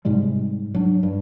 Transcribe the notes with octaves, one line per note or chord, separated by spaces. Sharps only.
G#2 C3 G3 G#3
F#3 D4
G2